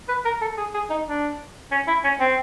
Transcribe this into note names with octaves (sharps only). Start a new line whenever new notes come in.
B4
A#4
A4
G#4
G#4
D#4
D4
C#4
E4
C#4
C4